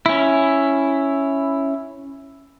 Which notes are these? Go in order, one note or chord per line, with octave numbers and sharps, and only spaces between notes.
C#4 E4